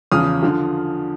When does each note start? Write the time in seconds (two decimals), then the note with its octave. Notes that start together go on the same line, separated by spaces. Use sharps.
0.12 E2 C#3 F3 D#6 F6
0.43 D3 F3